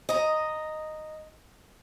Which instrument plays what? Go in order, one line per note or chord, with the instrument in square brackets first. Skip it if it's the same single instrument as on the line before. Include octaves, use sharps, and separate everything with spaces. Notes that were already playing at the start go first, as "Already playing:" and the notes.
[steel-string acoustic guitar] D#5 A#5